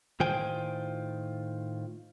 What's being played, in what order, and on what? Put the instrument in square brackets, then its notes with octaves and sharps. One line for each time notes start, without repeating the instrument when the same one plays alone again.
[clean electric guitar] A2 D#3 F4 C5 G5 G#5